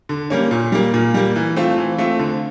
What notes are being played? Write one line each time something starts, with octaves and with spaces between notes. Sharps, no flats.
D3
G3 A#3 C#4
A#2
G3 A#3
A#2
G3 A#3
E3
A3 C4 F4
E3
A3 C4 F4
D3